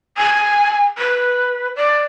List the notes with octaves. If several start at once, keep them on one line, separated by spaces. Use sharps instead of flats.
G#5
B4
D5